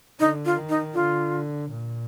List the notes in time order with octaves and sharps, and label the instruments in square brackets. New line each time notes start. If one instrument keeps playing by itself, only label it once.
[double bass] D3 [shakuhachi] D#4
[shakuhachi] F4
[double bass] D#3
[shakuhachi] D#4
[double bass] D3 [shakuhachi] F4
[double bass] A#2